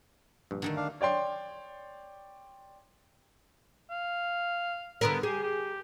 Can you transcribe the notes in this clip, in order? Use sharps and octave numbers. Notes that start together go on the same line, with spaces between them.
A#1 G2
D3 D#3 A3
D4 F5
C#5 D5 G5 C6
F5
D3 B3 A#4
G4 G#4
G4